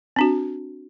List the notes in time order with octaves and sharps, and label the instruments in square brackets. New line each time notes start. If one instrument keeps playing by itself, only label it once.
[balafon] C4 D4 F#4